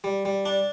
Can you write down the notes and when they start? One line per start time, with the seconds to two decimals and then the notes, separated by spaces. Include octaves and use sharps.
0.04 G3
0.25 G3
0.45 D4